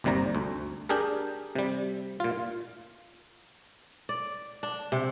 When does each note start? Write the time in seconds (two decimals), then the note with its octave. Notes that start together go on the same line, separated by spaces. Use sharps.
0.04 G1 D#2 C3 G3 A#5
0.35 D2
0.89 D4 G4 G#4 A#4
1.56 C3 G3
2.20 A#2 F4
4.09 D5
4.63 D4
4.92 C3